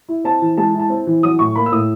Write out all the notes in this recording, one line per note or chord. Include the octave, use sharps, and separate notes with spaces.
E4
C4 A5
E3
G#3 A5
E4
A5
C4
E3
F#3 D#6
A2 C#6
A#3 B5
E6
A2 D#6